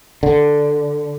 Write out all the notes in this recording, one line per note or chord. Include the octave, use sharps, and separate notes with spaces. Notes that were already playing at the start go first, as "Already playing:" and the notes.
D3